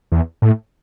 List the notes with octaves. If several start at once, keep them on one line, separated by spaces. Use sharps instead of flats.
E2
A2